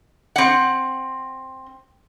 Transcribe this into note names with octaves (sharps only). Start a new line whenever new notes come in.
C4 F#5